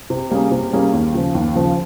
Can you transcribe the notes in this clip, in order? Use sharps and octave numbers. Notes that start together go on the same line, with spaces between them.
C3
G3 A#3 C#4 G#4
C3
G3 A#3 C#4 G#4
D#2
C#3 F3
D#2
C#3 F3